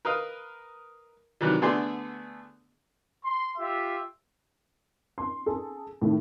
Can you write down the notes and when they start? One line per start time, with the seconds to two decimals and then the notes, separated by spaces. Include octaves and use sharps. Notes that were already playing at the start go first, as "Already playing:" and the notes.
0.05 A#4 B4 D#5 F5
1.41 C3 D#3 E3 F#3 G3
1.62 D3 A3 B3 G#4 D5 C6
3.23 C6
3.58 F4 G4 E5
5.18 C6
5.46 G#4 A4
6.01 A2 D#3 A3